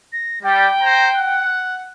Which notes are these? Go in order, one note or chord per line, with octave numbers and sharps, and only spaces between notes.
A#6
G3 G5
C5 A#5
F#5